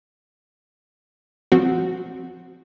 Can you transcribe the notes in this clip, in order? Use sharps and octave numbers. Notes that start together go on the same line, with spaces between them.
F3 C4 F#4